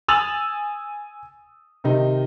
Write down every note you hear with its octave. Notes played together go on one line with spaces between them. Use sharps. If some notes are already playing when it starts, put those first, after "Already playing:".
G#5 D#6 E6 A6 F7 F#7
C3 D#3 D#4